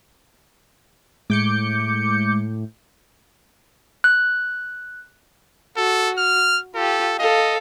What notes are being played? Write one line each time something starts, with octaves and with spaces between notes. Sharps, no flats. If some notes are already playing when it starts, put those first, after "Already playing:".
A2 G#3 D6 G6 C#7
F#6
F#4 A4
F6
F4 G4 A4
A4 D#5 F5